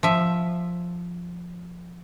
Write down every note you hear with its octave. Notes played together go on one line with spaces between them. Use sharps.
F3 E5